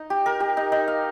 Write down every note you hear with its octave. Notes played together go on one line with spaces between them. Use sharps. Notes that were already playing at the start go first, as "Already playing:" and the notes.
Already playing: D#4
G4
A#4
G4
D#4
D#4
F5